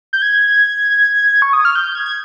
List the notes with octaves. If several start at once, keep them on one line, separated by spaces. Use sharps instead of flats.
G6
G#6
C#6
D#6
F6
G6
G#6
G#6